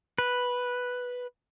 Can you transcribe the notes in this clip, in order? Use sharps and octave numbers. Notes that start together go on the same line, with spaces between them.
B4